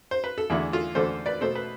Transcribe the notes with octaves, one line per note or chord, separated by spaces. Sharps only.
C5
B4
A4
E2 D3 A3 E4 G#4
F4 A4
E2 D3 A3 A4 C5
B4 D5
B2 A3 A4 C5
B4